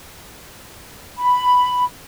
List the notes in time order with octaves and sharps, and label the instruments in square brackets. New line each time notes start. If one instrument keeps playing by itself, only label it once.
[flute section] B5